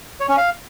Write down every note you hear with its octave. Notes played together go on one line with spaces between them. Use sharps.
C#5
C#4
F5